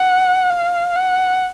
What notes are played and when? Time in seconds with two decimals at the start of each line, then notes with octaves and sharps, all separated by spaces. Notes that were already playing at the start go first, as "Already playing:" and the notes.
Already playing: F#5
0.50 F5
0.96 F#5